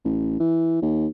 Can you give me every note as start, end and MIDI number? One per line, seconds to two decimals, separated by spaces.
0.05 0.37 33
0.40 0.78 52
0.82 1.07 39